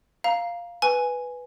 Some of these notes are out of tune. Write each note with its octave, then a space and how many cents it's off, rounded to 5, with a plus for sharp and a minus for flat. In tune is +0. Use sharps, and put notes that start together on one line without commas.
F5 +0 A#5 +10
B4 +0 G#5 +0